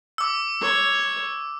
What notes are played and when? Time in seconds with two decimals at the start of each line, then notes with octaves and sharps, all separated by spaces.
0.18 D6 E6
0.61 C#5